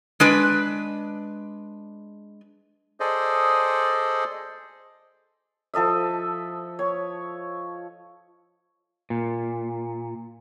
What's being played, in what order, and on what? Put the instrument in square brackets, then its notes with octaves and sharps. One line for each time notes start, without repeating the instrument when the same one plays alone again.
[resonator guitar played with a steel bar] G#3 D4 B4
[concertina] G#4 A4 C5 D5 D#5
[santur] F3 A4 D#5 E5
C#5
[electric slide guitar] A#2